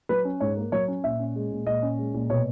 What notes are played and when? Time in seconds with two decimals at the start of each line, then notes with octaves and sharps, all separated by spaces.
0.09 F#3 B4
0.25 C#4
0.40 G#2 C#5
0.57 A#3
0.72 F#3 C#5
0.88 C#4
1.04 A#2 E5
1.19 C#4
1.36 G#3
1.51 A#2
1.66 A#2 D#5
1.83 C#4
1.99 G#3
2.14 A#2
2.30 B2 C#5